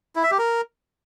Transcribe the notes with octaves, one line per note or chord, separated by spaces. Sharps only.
E4
E5
G4
A#4